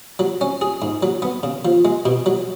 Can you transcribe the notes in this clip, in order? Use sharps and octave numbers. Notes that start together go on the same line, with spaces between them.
F#3
C#4
G#4
G#2
F#3
B3
C#3
F3
G#3
B2
F#3